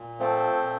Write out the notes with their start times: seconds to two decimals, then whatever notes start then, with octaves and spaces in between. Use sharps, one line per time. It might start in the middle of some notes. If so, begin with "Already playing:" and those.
Already playing: A#2
0.19 F3 A3 C4
0.60 A#2